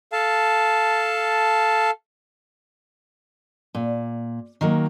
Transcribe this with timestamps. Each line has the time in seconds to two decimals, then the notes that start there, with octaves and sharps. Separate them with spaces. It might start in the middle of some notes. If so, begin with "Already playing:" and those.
0.12 A4 F5 A5
3.75 A#2
4.61 D#3 F#3 A#3